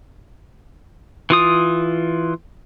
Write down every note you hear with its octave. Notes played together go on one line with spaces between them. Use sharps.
E3 F4 D#6